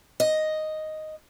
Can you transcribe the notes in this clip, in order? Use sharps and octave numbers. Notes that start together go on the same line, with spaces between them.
D#5